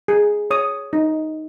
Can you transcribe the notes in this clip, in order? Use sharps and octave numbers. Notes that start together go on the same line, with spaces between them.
G#4
C#5 D#6
D#4